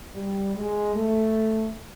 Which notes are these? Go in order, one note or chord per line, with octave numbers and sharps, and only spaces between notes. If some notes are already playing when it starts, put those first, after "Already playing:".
G3
G#3
A3